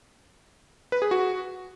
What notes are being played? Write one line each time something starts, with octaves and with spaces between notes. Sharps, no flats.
B4
G#4
F#4